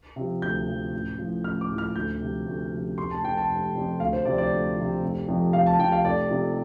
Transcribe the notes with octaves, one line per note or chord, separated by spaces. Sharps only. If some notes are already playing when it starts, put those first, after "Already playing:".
C3 F3
D2 G6
C3 F3
A1
A2 F3
A1 F6
D6
A2 F3
F6
D2 G6
C3 F3
D2
C3 F3
F1 C6
A5
F2 C3 G5
A5
F1
F2 C3
D2 F5
C5
C3 F3 D5
D5
D2
C3 F3
F1
F2 C3 F3
F1 F5
A5
F2 C3 F3 G5
F5
F1 D5
F2 C3 F3